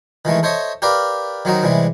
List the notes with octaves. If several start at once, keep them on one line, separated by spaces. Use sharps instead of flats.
D#3 E3 G#3 A3
A4 C5 C#5 D#5 E5
G4 A#4 B4 D5 F5
D#3 F#3 C4 D#4
C3 E3 G3 G#3